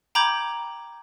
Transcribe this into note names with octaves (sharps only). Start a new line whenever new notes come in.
G5 A#5 B5 D6 G6 G#6